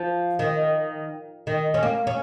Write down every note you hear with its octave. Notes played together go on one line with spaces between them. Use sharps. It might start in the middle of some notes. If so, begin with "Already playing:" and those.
Already playing: F3
D#3
D#3
C#4
A#3
C#4